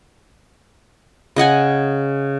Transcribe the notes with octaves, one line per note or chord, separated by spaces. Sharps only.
C#3 D#5 F#5 G#5